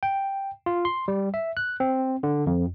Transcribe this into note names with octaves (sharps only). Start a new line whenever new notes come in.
G5
F4
C6
G3
E5
F#6
C4
D3
F2